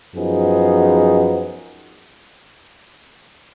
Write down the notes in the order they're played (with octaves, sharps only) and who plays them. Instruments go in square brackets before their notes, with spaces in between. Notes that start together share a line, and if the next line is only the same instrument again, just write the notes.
[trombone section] F#2 F3 B3 D#4 G#4